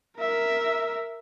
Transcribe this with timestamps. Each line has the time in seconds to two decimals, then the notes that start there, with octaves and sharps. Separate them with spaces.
0.19 A#4 E5